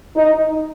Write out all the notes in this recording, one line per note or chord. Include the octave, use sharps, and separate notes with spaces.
D#4